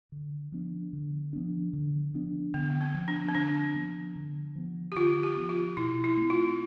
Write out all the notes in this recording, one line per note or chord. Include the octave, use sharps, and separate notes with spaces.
D3
F3 B3 D4
D3
F3 B3 D4
D3
F3 B3 D4
D3 B3
B3
C4
F3 B3
D4
C4
D3 D4
F3 B3
D3
F3 B3
G4
D3 F4
G4
F3 B3
F4
B2 E4
E4
A3 C4
F4